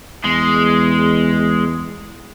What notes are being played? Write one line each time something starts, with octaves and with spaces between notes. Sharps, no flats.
E2 G#3